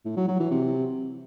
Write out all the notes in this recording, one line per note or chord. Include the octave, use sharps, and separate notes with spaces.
A2
F#3
F#3
E3
C3